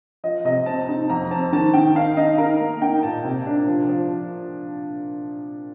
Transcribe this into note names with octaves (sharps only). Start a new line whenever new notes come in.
F3 D#5
C3 D#5
C4 A5
D#4
F2 A#5
C4 A5
D#3 A5
D#3 G5
D#4 F5
D#4 D#5
D#4 A#4
A#3
D#4 G5
A#2 A5
C3
D4
F3
F3